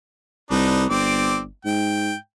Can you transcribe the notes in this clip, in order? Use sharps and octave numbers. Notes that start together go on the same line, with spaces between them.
C2 D4 D#4 B4
G1 C4 D5
G#2 G5